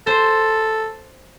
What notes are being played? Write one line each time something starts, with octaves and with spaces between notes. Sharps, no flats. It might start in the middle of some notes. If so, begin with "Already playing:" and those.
A4 C5